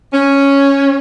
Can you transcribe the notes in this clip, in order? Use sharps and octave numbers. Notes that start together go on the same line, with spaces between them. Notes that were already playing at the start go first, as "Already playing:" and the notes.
C#4